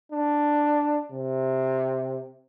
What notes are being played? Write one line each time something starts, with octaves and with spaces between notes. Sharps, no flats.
D4
C3